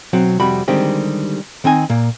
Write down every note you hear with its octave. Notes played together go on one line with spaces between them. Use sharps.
B1 F#3 C4 F#4
F2 C3 G3 F#4 B5
D3 D#3 G3 G#3 C4 G4
D#3 C4 D#4 G#5
A#2 A#3